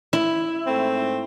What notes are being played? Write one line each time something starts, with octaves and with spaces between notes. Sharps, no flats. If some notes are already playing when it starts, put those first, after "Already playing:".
E4
G#2 A3 C4